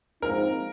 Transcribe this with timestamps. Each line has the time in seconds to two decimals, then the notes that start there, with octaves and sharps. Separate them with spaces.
0.22 A#1 G#2 F3 C4 D#4 A#4